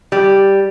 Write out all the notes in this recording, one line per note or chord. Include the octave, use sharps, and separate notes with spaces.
G3